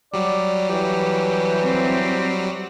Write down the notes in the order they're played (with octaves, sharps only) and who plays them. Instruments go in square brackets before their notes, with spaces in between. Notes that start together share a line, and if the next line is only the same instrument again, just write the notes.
[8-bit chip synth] F#3 G3 [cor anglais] D5
[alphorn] E3 [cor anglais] G4
[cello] C4